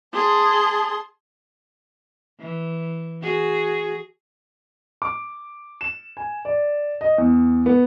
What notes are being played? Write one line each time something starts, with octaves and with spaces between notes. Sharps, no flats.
G#4 A5 C6
E3
F#4 G#4
D6
E7
G#5
D5
D#5
E2
B3